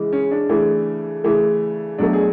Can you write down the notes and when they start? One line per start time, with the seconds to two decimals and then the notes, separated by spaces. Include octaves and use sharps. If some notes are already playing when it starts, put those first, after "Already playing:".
Already playing: C#3 E3 G#3
0.13 C#4
0.31 D4
0.49 C#3 E3 A3
1.24 C#3 E3 A3
1.98 B2 F#3 A3 D4
2.13 G#4